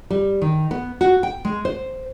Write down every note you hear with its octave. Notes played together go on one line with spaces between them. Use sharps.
G3
D#3
B3
F#4
G5
G#3
C5